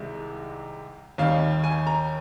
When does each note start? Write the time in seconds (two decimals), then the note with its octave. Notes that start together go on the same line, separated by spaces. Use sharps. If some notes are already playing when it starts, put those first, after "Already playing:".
Already playing: C2 C3 D#3 G#3
1.18 D#2 D#3 G3 F5
1.64 G#5
1.87 A#5